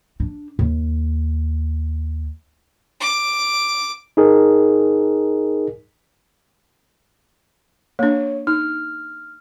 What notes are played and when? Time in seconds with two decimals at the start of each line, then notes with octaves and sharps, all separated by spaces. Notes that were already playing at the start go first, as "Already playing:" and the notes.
0.20 D4
0.59 D#2
3.00 D6
4.17 D#4 G#4 A#4
7.99 A#3 D4 C#5
8.47 D#4 F6